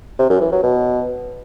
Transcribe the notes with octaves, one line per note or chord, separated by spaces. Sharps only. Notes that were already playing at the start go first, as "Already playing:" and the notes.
C3
F#2
E3
F#3
B2